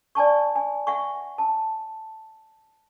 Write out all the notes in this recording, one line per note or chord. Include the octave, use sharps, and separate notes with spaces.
D5 G#5 A5 C#6
G#5
E5 F#5 G#5 C#6
A5